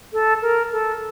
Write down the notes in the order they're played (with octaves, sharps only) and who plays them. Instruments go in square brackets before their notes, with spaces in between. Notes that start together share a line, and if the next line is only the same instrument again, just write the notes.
[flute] A4
A#4
A4